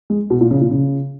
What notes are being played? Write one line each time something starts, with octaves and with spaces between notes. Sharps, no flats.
G#3
B2
A#2
C#3
A#2
C#3